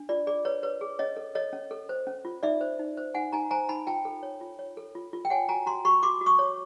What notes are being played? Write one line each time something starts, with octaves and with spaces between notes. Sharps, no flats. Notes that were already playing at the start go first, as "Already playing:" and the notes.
Already playing: D4
F4 D5
G#4 D5
B4 C#5
B4 C#5
G#4
C#4 C#5 D#5
A4
A4 C#5 D#5
C#4
A4
C5
C#4
F4
D#4 D5 E5
C5
D#4
C5
D#4 F#5 G#5
D#4 G#5 A#5
C5 G#5 A#5
D#4 A5 B5
F4 G5 A5
A4
C#5
F4
C#5
A4
F4
F4
G5
C#5 F#5 G#5
F#4 G#5 A#5
F#4 A#5 C6
F#4 B5 C#6
F#4 C6 D6
F#4
C#6 D#6
C#5